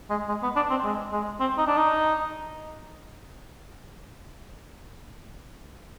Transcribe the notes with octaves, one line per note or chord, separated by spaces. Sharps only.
G#3
G#3
B3
D4
C4
G#3
G#3
C4
D#4
D4
D#4